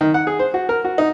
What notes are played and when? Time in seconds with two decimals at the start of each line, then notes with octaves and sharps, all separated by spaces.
0.01 D#3
0.14 F#5
0.27 G#4
0.39 C5
0.54 F#4
0.69 A#4
0.84 F#4
0.98 D#4